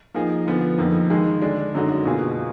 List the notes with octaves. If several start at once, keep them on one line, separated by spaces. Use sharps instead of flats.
F3 A#3 D#4 G#4
D3 F3 B3
F2 F3 A#3 D#4
D#3 G#3 D#4 G#4
D3 G#3 D4
F#2 D3 G#3 D#4 F#4
B2 A#3 F4 G#4